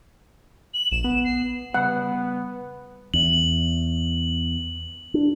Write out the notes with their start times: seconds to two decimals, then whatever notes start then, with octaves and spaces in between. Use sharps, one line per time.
0.74 F#7
0.92 A#1 E7
1.04 B3
1.24 C7
1.74 C#3 G3 B3 F#5
3.14 E2 F#7
5.14 D4